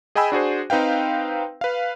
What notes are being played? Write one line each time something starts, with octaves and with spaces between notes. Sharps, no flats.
G#4 D#5 G5 G#5 B5 E6
D4 F#4 G#4 C5
C4 D#4 B4 F5 G5
B4 F5